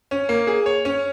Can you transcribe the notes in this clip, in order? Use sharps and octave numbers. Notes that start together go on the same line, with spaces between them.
C#4
A#3
G#4
C#5
C#4